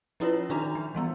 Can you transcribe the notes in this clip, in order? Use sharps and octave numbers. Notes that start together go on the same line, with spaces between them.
F3 C#4 E4 F4 B4 C#5
D#3 D4 D#4 F#4 A#5 F7
F3
E3 G3 B3